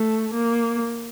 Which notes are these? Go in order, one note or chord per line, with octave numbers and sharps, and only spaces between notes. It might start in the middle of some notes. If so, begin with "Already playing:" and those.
Already playing: A3
A#3